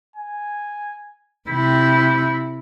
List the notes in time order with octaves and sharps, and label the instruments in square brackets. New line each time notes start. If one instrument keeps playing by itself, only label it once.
[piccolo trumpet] G#5
[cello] C3 E4 [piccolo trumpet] G6